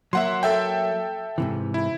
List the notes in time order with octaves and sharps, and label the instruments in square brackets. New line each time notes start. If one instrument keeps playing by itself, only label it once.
[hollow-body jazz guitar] F#3 A#3 [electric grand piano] E5 F#5 C6
[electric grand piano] A4 E5 G5
[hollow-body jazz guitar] G#2 C3 E3
[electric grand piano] E4